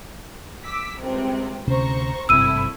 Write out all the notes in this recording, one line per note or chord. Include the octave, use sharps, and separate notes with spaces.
D6 E6 B6
C#2 C3 G3
D2 C3 C#4 C5 A#5 C#6
G#1 G2 C3 A3 C4 E4 E6 D#7